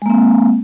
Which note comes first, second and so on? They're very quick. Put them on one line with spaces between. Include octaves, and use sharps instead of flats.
G#3 A#3 C4